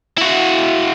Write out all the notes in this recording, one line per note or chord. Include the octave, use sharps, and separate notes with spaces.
E4 F#4